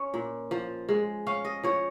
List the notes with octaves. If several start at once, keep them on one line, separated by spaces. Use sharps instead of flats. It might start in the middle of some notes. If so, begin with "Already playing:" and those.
Already playing: C#4 C#5
A#2
F3
G#3
C#4 F5
D#5
F3 C#5